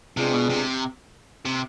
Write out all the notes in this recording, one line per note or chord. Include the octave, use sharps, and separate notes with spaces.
C3 G#3 B3 D4 F4 G#4
B2
C3
C3